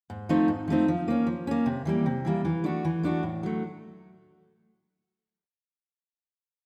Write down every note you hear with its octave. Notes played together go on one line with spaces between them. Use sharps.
G#2
F3 A3 C4 D#4
G#2
F3 A3 C4 D#4
F3
A#3 C#4
F3
A#3 C#4
C3
E3 G3 A#3
C3
E3 G3 A#3
E3
A3 D4 F#4
E3
A3 D4 F#4
A2
F#3 A3